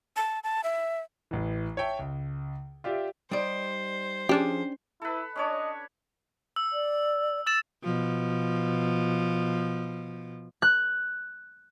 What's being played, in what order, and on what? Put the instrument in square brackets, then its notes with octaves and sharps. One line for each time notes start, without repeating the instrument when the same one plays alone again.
[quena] A5
A5
E5
[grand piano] A1 E3
C#5 E5 G5 A5
C#2
F4 G4 D5 E5
[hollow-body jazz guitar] G3 D#4 D5 [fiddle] C5
[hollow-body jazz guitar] F3 G#4 [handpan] C#4 [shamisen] D4 G4
[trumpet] E4 [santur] A4 B4
[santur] C#4 D4 C#5 [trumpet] D#5
[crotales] E6
[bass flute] D5
[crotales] E6 A6 E7
[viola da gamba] B2 F3
[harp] F#6